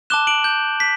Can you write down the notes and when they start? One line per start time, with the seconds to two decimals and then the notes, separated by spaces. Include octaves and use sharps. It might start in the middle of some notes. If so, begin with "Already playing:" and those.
0.10 A5 D6 F#6 E7 G7
0.27 D7 F#7
0.44 G6
0.80 B6